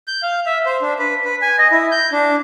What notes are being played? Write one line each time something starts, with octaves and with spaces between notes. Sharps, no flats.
G6
F5
E5
C5
D4
B4
B4
G#5
D#5
E4
G6
D4